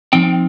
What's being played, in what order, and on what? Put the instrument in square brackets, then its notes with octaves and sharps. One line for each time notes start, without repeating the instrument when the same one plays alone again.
[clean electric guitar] F3 C4 D#4 G5